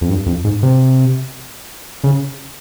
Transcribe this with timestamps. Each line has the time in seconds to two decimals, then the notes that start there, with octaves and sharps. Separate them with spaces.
0.01 F2
0.09 G2
0.26 F2
0.44 G#2
0.63 C3
2.04 C#3